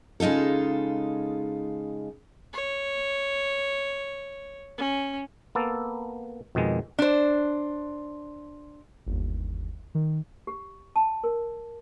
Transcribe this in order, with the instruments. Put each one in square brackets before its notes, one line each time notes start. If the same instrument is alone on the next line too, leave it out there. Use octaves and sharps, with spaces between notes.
[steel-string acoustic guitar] C#3 G#3 D#4 F4 A4
[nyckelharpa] C#5
C#4
[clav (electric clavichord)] A#3 B3 A4
F2 B2 D#3 G#3
[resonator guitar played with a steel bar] D4 C5
[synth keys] G1 D#2
D#3
[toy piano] G4
A5
A#4